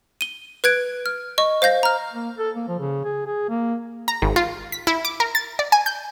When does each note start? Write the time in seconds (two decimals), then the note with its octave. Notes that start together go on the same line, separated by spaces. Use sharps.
0.21 D#7 G7
0.64 B4 F#6 G#6 D7
1.06 F6
1.38 D#5 C#6
1.62 C5 F5 G6 A#6
1.83 A#5 F6
2.13 A#3
2.39 A4
2.56 A#3
2.68 F3
2.80 C#3
3.05 G#4
3.26 G#4
3.49 A#3
4.08 A#5
4.22 G#1
4.36 F4
4.72 B6
4.87 E4
5.05 D6
5.20 A#4
5.35 A6
5.59 D5
5.72 G#5
5.86 G6